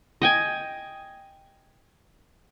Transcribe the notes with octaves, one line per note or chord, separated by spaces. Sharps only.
D#5 G5 G#5